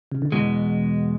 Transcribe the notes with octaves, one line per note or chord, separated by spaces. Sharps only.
C#3
D3
E2 B2 E3 G#3